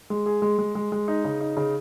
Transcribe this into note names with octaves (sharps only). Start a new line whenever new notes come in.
G#3
G#4
G#3
G#3
G#3
G#3
D#4
C#3
D#4
C#3